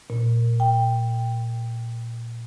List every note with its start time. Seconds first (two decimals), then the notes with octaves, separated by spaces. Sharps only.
0.10 A#2
0.60 G5